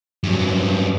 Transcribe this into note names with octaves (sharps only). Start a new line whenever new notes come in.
G2 F#3